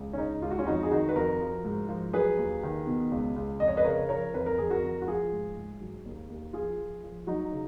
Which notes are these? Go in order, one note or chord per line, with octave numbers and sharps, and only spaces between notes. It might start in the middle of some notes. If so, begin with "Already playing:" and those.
Already playing: C#2
C#4
C#3 D#4
C#2 F4
F#4
C#4 F4
F2 D#4 F#4
G#4
D#3 D#4 F#4
B4
F2 F#4 A#4
F3
G#2
F3
F#3 G#4 B4
D#2
D#3
B2
C#2
C#2
F2 D#5
C#5
B4 D#5
C#3 A#4 C#5
F3 A#4 C#5
F2 B4
A#4
F2 G#4
F#4 A#4
F2
F#4
F3 F4 G#4
G#2
G#2
F#3
D#2
D#2
F3 F4 G#4
F3
F3
F#3 D#4 F#4
C#3